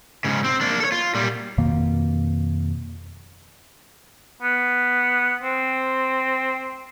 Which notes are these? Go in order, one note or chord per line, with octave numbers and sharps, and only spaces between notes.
G#2 C#3
C4
A#3 D4
A4 C#5
F4
A#2 G3
F2 B2 D#3 A#3
B3
C4